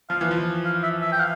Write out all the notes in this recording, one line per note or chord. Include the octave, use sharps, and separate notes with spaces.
F3 F5
E3
F3
F5
E5
E5
G5
F5